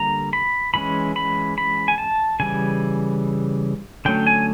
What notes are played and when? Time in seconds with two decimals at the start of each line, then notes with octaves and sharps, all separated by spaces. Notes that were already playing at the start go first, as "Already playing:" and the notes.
Already playing: D3 G3 A#3 A#5
0.33 B5
0.74 E3 G#3 C#4 B5
1.16 B5
1.58 B5
1.88 G#5
1.98 A5
2.40 C#3 E3 G3 G#5
4.05 D3 F#3 A3 C#4 G5
4.27 G#5